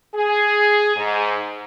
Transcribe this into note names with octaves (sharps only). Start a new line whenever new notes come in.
G#4
G#2